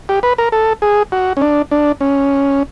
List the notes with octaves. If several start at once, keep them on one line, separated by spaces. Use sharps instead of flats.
G4
B4
A#4
A4
G#4
F#4
C#4
D4
D4
C#4